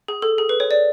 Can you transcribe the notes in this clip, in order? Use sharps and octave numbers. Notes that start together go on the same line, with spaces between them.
G#4
A4
G#4
B4
C#5
D5